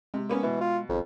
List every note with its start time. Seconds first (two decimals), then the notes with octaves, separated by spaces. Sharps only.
0.14 C3 G#3
0.29 A#3 B3 C#4
0.43 B2 E3
0.61 F4
0.89 G#1 F2